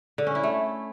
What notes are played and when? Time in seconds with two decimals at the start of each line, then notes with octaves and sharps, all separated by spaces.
0.18 D3
0.27 C#4
0.35 E4
0.43 A3